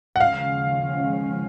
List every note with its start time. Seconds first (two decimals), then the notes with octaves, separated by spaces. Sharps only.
0.16 F#5
0.20 D#2 C#3 F3 G#3 C#4 F5